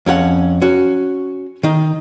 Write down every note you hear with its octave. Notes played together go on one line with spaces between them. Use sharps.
F2 C#4 A4 F#5
C#4 F#4
D#3 D#4